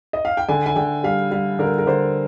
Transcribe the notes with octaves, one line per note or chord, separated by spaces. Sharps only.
D#5
F5
G5
D3 G#5
G#5
D3 G5
G3 F5
G3 F5
D3 A#4
A#4
D3 C5